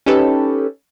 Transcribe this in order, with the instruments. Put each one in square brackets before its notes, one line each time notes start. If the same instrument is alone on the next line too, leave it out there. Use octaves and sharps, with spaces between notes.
[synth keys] C#4 D#4 G4 A4 B4